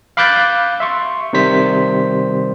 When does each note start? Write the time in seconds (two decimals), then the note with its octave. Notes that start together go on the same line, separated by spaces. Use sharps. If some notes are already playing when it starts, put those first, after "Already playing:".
0.17 F5 B5 D6 F#6 G6 A6
0.80 E5 C6 C#6
1.33 C3 D#3 G3 C5 B6